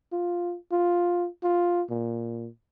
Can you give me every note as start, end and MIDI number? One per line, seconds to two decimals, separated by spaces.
0.12 0.56 65
0.72 1.28 65
1.43 1.82 65
1.90 2.48 46